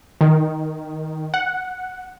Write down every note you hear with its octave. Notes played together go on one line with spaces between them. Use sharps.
D#3
F#5